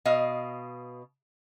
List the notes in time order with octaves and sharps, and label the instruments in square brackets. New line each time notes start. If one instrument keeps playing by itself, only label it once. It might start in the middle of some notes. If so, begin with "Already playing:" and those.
[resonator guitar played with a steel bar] B2 D#5 F5